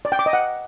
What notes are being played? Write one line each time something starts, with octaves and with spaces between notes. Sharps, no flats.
D5
G5
D6
D#5
F#5